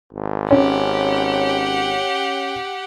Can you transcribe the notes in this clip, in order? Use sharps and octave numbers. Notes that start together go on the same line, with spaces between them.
G#1
C#4 G4 F#5